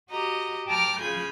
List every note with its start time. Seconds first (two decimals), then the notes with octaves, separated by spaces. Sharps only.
0.10 F#4 G4 D#5 A#5
0.67 G5 A5 A#5 D6 F6
0.99 C#3 F4 G#5 B5 G6